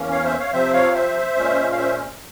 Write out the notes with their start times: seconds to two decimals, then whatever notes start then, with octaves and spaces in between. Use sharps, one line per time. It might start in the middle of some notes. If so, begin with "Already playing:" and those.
Already playing: E2 E3 A#3 C#4
0.11 C#5 F5
0.24 C5 E5
0.39 C#5 F5
0.53 C3 F3 C4 C5 E5
0.73 C#5 F5
0.94 C5 E5
1.36 A#2 G#3 C#4
1.72 F5
1.77 C5 E5